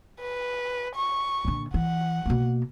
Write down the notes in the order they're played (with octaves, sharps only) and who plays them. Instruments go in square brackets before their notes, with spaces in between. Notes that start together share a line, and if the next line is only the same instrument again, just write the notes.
[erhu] B4
C#6
[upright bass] A#2 D3
[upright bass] E3 [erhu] F#5
[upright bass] B2 A#3